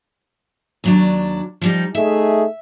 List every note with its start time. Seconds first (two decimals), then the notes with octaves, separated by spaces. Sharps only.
0.84 D#2 F#3 D4
1.61 F3 G3 D#4
1.95 A3 D#4 G#4 E5